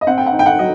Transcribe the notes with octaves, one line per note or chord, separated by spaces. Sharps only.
D#5
C4 F#5
G5
F#5
D#4
G5
F#5
F#3 D#5